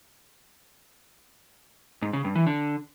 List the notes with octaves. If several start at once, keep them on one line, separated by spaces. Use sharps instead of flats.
G#2
C#3
G2
E3
D3